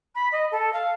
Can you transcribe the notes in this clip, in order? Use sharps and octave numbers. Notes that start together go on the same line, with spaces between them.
B5
D#5
A4
F5